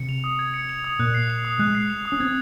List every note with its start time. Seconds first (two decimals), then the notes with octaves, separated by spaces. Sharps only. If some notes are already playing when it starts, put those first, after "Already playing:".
Already playing: C3 C#7
0.09 F7
0.24 D#6
0.39 G#6
0.54 C#7
0.69 F7
0.84 D#6
0.99 A#2 F#6
1.14 C7
1.30 F7
1.45 D#6
1.59 G#3 F#6
1.75 C7
1.90 F7
2.05 D#6
2.12 C#4
2.20 C4 G#6